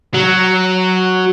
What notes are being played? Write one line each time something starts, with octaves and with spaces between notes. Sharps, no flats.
F#3